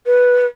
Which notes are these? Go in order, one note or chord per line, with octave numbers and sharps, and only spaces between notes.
B4